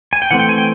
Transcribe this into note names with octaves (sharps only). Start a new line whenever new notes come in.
G#5
G5
E3 A3 C4 F#5
G5
G#5
G5